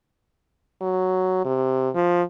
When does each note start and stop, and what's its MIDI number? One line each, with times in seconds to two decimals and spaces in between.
0.82 1.40 54
1.45 1.89 48
1.95 2.22 53